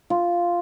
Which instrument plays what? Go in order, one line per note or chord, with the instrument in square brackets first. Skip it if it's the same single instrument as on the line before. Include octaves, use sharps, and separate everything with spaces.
[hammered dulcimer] F4